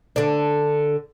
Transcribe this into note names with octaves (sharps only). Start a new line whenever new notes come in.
D3 D4